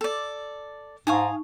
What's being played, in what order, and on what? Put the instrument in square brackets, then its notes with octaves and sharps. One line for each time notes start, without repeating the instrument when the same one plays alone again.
[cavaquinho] A4 D5
[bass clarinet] G#2 [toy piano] D#4 C#6 [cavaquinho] F5 G#5 D#6